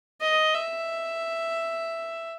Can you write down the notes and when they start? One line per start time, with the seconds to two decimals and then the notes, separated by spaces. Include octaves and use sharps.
0.21 D#5
0.54 E5